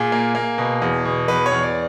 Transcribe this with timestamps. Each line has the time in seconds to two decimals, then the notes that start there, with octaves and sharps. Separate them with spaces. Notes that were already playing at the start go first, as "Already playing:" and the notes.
Already playing: A#2 G#4
0.12 A#3
0.35 A#3
0.58 B2
0.82 E2
1.05 B2
1.28 E2 B4
1.46 C#5
1.52 E2
1.63 D5